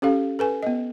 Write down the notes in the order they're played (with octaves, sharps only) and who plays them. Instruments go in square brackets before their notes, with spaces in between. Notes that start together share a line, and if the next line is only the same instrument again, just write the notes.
[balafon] C#4 G4 A4 F5
A4 B4 G#5
B3 D#5